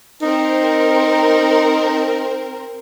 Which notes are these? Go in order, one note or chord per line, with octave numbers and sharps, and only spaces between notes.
C4 D#4 A#4